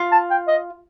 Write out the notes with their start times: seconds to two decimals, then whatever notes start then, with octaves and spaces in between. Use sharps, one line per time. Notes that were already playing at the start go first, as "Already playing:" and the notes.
Already playing: F4
0.12 A5
0.30 G5
0.48 D#5